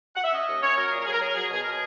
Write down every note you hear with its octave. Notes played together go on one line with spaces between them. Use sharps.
F#5
E5
C#4 D#5
D#2
C#4 C#5
F#3 A#4
A#2 G#4
A#4
F#3 G#4
A#4
F#3 G#4
A#4
F#3 G#4
B2 G#4
B2 A#4
G#4